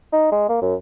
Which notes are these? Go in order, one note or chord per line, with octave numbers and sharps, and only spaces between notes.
D#4
G#3
A#3
F#2